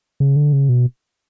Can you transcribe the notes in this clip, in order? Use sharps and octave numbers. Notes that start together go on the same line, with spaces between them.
C#3
D3
C#3
B2